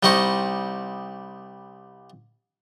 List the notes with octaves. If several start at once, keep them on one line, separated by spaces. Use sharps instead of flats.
C2 G3 D#4 C5 D#5 C#6